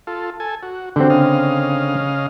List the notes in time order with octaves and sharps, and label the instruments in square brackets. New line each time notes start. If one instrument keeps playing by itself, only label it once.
[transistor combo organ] F4 A4
A4 G#5
F#4
[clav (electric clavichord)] D3 C4 [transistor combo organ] F#4 G4
[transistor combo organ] C#3 D#5 F5